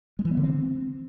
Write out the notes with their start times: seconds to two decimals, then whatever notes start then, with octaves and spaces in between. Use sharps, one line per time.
0.19 G#3
0.25 E3
0.31 B3
0.37 D3
0.43 C4